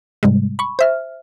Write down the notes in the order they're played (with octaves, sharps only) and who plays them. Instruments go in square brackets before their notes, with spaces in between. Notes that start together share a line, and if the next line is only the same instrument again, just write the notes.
[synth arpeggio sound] G#2 C3 G3 G#3
B5 C#6
C5 E5 F6